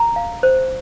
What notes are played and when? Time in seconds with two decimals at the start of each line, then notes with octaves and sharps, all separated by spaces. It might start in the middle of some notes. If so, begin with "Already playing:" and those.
Already playing: A#5
0.16 F5
0.43 C5